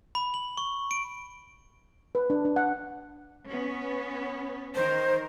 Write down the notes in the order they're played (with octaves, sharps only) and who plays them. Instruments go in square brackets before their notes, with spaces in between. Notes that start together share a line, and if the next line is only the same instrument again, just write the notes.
[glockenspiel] B5
F#7
C#6
D7
[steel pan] B4
D4
D4
F#5
[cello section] B3 C#4 B4
[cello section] D#3 A#4 [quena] C5